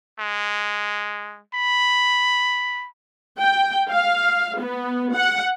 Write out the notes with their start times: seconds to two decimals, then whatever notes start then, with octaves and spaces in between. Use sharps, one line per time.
0.20 G#3
1.54 B5
3.40 G5
3.90 F5
4.59 B3
5.15 F#5